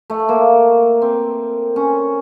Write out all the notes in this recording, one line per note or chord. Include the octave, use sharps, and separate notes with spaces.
A3
A#3
C4
C#4